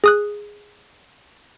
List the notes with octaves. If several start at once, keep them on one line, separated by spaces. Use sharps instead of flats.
G#4 D#6 F#6